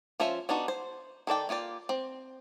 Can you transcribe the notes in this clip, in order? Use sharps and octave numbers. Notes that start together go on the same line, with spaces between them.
F3 C#4 F4 C5 E5
B3 D4 D#4 F#4
C5
D#3 A4 D5 G5
A#3 F4 G4 D5
C4